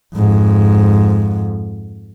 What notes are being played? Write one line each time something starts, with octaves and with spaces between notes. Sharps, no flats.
F2 G#2